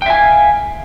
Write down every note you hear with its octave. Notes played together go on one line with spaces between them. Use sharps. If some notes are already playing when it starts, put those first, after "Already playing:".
E5 F5 G5 G#5